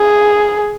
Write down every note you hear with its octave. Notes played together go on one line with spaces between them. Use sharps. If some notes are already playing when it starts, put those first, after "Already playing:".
Already playing: G#4